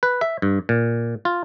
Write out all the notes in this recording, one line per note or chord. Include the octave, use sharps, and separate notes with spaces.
B4
E5
G2
A#2
F4